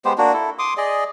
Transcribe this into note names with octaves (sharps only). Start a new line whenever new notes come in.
G#3 B3 G4 C5
A#3 D4 F#4
E4 A4
C6 D6 D#6
G#4 D5 D#5